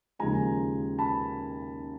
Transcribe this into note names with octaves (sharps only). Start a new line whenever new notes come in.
D#2 C#3 F3 G#3 G#5 A#5
A5 B5